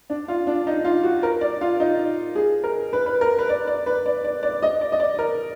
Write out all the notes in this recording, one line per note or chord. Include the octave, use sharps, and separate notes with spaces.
D4
F4
D4
D#4
F4
F#4
A#4
D5
F4
D#4
G#4
A#4
B4
B4
A#4
B4
D5
D5
B4
D5
D5
D5
D#5
D5
D#5
D5
A#4